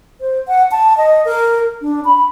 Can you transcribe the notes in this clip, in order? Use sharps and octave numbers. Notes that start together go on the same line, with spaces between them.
C5
F#5
A5
D#5
A#4
D4
B5